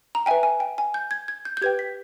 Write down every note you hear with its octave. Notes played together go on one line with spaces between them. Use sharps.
A#5
B4 E5 G5 G#5
G#5
G5
G#5
G6
G#6
G#6
G6
G6
G4 B4 G5 G#6
B6